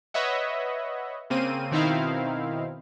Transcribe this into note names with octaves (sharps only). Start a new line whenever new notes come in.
B4 C#5 D#5 E5 F#5
C#3 A#3 C4 D#7
B2 D#3 C4 D#4 E4 F5